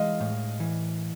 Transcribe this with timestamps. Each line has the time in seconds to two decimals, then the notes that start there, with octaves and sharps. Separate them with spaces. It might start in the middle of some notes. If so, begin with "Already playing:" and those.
Already playing: E3 G#3 D#5 F5
0.20 A2
0.60 E3